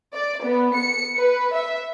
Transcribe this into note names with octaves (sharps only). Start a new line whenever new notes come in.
D5
B3
C#7
B4
E5